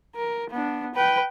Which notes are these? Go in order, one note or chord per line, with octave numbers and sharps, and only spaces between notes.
A#4
B3 D4
B4 G5